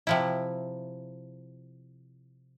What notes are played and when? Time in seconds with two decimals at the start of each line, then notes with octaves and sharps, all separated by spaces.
0.07 C3 F3 E4